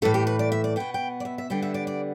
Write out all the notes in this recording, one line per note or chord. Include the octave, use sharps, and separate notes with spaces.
A2 E3 A3 A4
G4
B4
D5
E5
D5
B2 B3 G5
G5
D5
E5
E5
D3 G3 B3 G5
E5
D5
D5